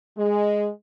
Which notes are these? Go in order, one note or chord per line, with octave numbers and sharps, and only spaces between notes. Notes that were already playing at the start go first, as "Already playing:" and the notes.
G#3